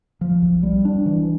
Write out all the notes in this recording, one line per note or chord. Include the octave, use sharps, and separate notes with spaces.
F3
B1
G3
D4
E3